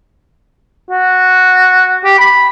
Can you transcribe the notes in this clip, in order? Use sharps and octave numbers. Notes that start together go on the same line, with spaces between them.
F#4
G4
B5